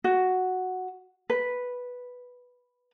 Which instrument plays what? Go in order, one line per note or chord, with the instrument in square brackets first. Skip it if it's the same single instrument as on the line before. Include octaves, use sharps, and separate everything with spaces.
[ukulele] F#4
B4